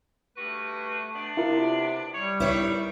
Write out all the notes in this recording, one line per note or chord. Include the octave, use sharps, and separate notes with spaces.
G2 A3 F#4 B4
B3 D4
C3 E4 F4 A#4
G3 C#5
C#2 D#3 E4 B4 C#5